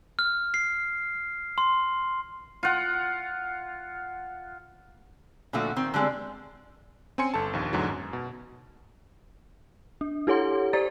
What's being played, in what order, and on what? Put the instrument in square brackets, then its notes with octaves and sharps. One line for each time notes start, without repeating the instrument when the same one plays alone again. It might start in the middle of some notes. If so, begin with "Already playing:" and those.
[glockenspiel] F6
C7
C6
[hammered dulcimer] F4 F#5
[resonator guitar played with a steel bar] A#2 D3 F3 A3 F#4
D#3 C4
D3 G3 G#3 B3 C4
[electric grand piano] C4 C#4 G#5 C6 C#7
G1 A4 A5
A#1 D#2
E2 G#2 D3 F#3
F#2
B2
[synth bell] D4
E4 G4 A4 C#5 F#5 C6
G4 C5 D5 A#5 A6